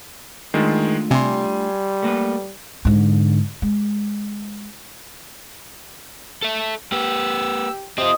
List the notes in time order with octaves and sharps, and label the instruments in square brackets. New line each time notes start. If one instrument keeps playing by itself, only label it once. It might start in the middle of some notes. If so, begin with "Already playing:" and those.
[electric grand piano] D#3 G#3 [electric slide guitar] A3 D4 F4
[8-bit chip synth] C3 [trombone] G3 [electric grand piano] G#5 C6
[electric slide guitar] A3 A#3 B4
[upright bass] G#2 D3
G#3
[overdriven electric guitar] A4 E5
[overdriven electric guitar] A#3 B4 [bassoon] G4 [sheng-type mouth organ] E6
[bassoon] C3 [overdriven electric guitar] C4 F4 [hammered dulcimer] D#5